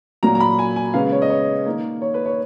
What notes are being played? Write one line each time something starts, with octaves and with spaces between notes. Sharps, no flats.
A#2 F#3 A#3 A#5
A#5
B5
G#5
G#5
C#3 G#3 B3 F5
C#5
D#5
C#5
D#3 A#3
C#5
B4
C#5